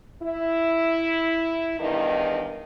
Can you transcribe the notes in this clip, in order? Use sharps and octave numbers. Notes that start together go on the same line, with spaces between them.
E4
E2 G2 D#3 D#4